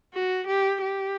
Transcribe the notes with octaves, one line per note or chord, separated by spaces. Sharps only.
F#4
G4
G4